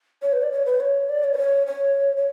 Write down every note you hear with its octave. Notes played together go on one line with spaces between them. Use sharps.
C#5
B4
D5
C#5
B4
C#5
D5
C#5
B4
C#5
C#5
C#5